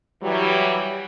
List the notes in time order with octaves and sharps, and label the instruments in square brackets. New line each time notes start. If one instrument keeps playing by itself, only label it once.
[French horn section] E3 F#3 G3